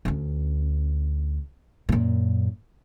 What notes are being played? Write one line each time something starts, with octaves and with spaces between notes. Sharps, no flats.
D2 C#4
F#2 A#2